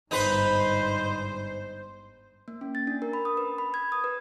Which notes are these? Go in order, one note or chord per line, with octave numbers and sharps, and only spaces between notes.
G1 G#2 D#4 B4 C5
A#3
C#4
A6
D4
A#4
B5
D#6
B4
B5
G#6
D#6
B4